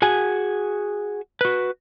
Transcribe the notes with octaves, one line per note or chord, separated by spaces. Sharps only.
F#4 G#4 G#5
F#4 B4